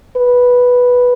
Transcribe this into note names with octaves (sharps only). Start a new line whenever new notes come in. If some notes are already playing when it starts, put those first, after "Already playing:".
B4